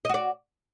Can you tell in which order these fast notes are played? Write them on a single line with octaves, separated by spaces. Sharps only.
D#5 F#4 D5